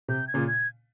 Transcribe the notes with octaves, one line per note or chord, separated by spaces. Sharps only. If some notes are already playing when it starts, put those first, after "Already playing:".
C3 G6
G#6
A#2 C#3
G#6